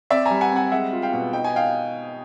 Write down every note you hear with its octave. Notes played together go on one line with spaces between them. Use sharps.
C4 D5 E5
G3 G#5 A#5
F#5 G#5
C4 F#5 G#5
G#3 E5 F#5
F4
F5 G5
B2
D#4 G5
G#5
D#4 F5 G5